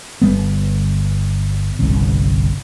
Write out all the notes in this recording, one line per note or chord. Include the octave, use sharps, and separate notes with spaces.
G1 G3 B3
G1 C2 C#3